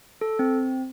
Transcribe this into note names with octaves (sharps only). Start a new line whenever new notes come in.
A4
C4